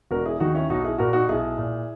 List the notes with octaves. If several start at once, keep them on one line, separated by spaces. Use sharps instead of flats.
E1 F#4 A#4
E4 G#4
D#2 D#3 D#4 F#4
C#4 E4
B1 D#4 F#4
E4 G#4
A#2 F#4 A#4
D#4 F#4
B1 E4 G#4
A#2